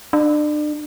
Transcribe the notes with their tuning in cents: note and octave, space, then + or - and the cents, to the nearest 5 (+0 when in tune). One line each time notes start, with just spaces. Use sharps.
D4 +35